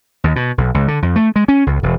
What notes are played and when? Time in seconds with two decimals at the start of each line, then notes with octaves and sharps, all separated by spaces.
0.24 D#2
0.36 B2
0.58 B1
0.74 C#2
0.88 D3
1.02 F2
1.16 A3
1.36 G#3
1.48 C#4
1.67 C#2
1.83 E1